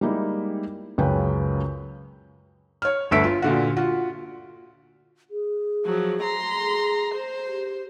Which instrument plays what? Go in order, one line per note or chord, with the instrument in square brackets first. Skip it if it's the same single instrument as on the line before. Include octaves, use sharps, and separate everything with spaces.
[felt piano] G3 G#3 A#3 D#4 E4
C#2 F#2 C#3 C#4 B4 G5
C#5 F6
G1 D2 A4 E5 B6 D7
F4
A#2 D3 F#4
F4 F#4
[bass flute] G#4
[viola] F3 F#3
A#5 C6
[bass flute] G#4
[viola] C5
[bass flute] G4